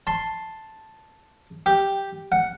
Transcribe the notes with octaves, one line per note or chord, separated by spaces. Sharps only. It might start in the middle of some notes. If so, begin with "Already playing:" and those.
A5 C6
G4
F#5